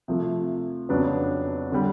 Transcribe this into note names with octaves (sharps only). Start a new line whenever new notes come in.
C3 F3 A3
F2 C#3 F#3 B3 D4
D3 G3